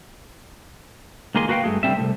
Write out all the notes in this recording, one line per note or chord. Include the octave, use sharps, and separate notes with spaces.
C#2 D#3 A#3 G#4 D#5 C6
A#3 F#4 B4 F5 G5
G2 C#3 A3 G#4
C2 D3 G3 C4 E5
C2 G2 A3